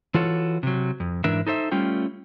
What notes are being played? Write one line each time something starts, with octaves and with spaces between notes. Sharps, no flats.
E3 F4 F#4 A4 C#5
C3 F#3
F2
G#2 E3 D4 A#4 E5
D#4 A4 C5 E5
G3 A3 C#4 F4 G5